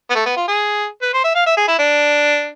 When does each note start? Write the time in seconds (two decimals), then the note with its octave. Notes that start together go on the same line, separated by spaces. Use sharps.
0.10 B3
0.15 A3
0.26 B3
0.37 F4
0.48 G#4
1.02 B4
1.13 C5
1.24 E5
1.35 F5
1.46 E5
1.57 G#4
1.68 E4
1.79 D4